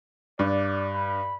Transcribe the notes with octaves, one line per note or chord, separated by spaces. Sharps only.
G2 D5
B5